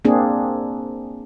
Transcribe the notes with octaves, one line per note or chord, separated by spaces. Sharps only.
A#3 C4 D4 G#4